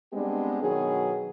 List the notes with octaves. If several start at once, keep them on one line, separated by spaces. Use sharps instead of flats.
G3 G#3 B3 C4 D4 G4
B2 D#3 F#3 B3 G#4